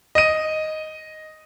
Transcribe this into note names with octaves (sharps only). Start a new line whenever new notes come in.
D#5 D#7